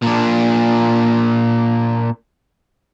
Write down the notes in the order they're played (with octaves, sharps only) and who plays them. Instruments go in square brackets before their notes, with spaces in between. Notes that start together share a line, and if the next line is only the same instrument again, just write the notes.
[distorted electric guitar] A#2 D4